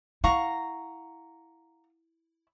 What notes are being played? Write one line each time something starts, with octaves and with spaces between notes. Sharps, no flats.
E4 F5 F#5 A#5 C#6